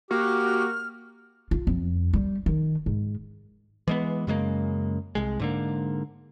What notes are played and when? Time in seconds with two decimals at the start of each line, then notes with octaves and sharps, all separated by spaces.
0.11 A#3 F#4 G4 F6
1.51 F4
1.67 F2
2.13 G3
2.46 D#3
2.86 G#2
3.88 E3 G#3 B3
4.27 F#2 C#3 G#3 A#3
5.15 C2 G#3
5.40 G#2 D3 A#3